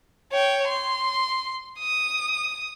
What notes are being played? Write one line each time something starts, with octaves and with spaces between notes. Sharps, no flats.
C#5 G5
C6
D#6